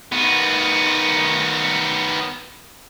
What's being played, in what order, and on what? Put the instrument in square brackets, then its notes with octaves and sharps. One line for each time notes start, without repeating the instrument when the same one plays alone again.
[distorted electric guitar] D#3 B3